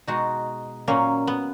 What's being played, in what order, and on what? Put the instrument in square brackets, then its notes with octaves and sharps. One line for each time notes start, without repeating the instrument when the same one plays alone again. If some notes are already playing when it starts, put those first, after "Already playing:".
[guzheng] B2 G#3 D#4 F#4
A#2 F#3 A#3 C#4
B3